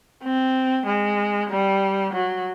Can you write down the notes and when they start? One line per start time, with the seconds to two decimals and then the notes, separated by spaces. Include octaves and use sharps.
0.24 C4
0.86 G#3
1.50 G3
2.13 F#3